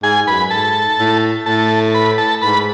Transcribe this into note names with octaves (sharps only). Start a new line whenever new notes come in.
G#2 G#4 G#5
F#2 B4 B5
G#2 A4 A5
A2
A2 A4 A5
B4 B5
A4 A5
G#2 B4 B5